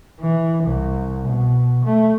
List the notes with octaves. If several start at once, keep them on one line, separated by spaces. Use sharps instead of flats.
E3
C2
B2
A3